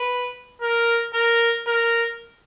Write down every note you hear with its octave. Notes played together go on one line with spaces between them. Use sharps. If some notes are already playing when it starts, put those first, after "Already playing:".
Already playing: B4
A#4
A#4
A#4